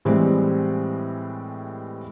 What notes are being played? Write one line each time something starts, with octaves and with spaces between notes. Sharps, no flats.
A2 E3 G3 G#3 C4